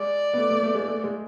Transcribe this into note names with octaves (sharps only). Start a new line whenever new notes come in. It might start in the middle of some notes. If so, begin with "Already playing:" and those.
Already playing: G#3 D5
B3
A3
A3
A3
G#3
A3
G#3